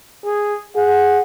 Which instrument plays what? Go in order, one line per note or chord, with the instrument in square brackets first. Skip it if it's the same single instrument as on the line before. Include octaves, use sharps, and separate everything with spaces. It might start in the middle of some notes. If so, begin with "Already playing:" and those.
[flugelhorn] G#4
[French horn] G#4 [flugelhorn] F#5